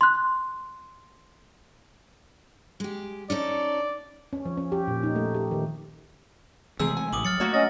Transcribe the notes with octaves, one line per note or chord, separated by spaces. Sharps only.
C6 F#6
G#3 G4
C#4 D#4 A4 D5
C#4
F3
C#4
G4
A#2
D#4
A3
G4
D#3
C3 E3 G#3 A3 G#4 E6
G#5
A1 D6 D#6 F#7
F#3 F6 A6 C#7
A3 A#3 F#4 C#5
F#3 C#4 D#5 A6